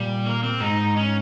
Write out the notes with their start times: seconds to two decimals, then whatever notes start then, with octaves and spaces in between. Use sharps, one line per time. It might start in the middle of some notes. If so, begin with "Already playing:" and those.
Already playing: A#2 G3
0.26 A#3
0.43 C4
0.60 G#2 D#4
0.97 C#4